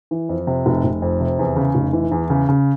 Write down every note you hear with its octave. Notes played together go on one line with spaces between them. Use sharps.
E3
F2
C3
F1
F1
F2
C3
E2
C#3
F1
E3
E2
C#3
C#3